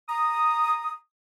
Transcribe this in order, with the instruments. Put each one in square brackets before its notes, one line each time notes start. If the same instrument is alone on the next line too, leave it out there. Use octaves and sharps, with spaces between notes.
[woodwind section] A#5 D#6